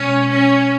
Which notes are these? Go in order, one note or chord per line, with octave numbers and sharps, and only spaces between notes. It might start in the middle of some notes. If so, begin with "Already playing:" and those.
Already playing: B2 G#3 C#4
C#4